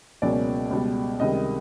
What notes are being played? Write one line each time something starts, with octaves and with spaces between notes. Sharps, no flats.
C#2 B2 F#3 A#3 C#4 D5
C#2 B2 G3
C#2 C3 D#3 G3 D#5